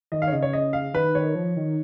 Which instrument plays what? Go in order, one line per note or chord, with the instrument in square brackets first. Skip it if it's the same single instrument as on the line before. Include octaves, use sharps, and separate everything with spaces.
[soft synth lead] D#3 [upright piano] D#5
[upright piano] F5
C#5
[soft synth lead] C#3 [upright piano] D#5
[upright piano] C#5
D#5
F5
[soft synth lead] D#3 [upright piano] B4
[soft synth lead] D#3 [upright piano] C#5
[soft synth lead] F3
D#3